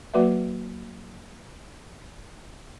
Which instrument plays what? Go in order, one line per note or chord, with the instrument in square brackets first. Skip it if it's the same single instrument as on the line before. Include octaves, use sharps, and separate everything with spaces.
[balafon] F#3 A#3 F#4 B4 D5 E5